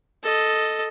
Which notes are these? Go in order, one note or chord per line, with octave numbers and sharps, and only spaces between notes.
A4 D#5